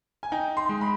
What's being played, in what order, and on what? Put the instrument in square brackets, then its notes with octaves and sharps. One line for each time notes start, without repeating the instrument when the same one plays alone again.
[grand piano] G#5
[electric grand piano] D#4 [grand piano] G5
[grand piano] C6
[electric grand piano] G#3
[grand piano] B5